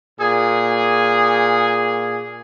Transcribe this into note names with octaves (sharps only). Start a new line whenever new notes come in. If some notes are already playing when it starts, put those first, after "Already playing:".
A#2 G#4